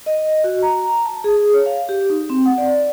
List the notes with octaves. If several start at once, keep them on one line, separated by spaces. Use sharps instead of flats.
D#5
F#4
A#5
A5
G#4
C#5
F5
G4
D#4
C4
F#5
D5